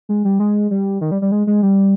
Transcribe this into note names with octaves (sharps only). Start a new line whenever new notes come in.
G#3
G3
G#3
G3
D#3
G3
G3
G#3
G#3
G3